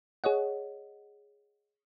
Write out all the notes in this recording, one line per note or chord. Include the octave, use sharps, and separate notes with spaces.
G#4 C#5 D#5 F#5